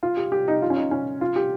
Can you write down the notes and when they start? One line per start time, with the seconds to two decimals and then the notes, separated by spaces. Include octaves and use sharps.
0.03 F4
0.17 G4
0.32 G4
0.48 D#4
0.62 F4
0.70 C#4
0.77 D#4
0.91 C#4
1.21 F4
1.36 G4